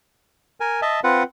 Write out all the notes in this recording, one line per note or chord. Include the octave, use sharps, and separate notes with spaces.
A#4 G#5
D#5 E5 A5
C4 F4 B4 F#5